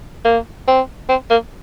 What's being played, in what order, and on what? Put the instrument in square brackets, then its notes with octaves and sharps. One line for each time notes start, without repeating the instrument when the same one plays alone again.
[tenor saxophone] A#3
C4
C4
A#3